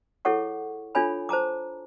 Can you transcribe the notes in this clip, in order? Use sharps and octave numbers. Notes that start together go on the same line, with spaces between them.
E4 G#4 A4 C#5 F#5 C#6
D4 F4 A4 C#5 G#5 B5
C5 A5 A#5 D6